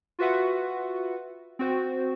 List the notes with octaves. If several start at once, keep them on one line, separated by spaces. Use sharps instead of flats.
F4 F#4 B4 E5 F#5
C4 F#4 C5